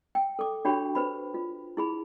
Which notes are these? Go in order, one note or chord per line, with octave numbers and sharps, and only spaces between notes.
G5
A4 D6
D4 F#4 G4 C#5 G5 B5
B4 C5 B5
F4
E4 G#4 B5